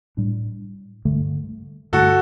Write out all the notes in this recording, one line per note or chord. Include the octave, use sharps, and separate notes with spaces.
A2 G3 D4
G2 D3 A3
G2 D3 A3 F#4 A4